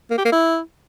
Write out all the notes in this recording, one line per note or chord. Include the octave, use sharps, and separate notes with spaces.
A#3
G4
A#3
E4